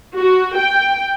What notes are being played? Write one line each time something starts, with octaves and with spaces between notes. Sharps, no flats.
F#4
G5